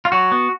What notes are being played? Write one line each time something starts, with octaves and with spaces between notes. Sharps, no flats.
F4
F#3 F#4
B3